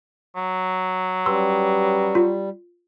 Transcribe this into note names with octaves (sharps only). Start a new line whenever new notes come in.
F#3
G3 C#4 G4 B4 C6 E6
F4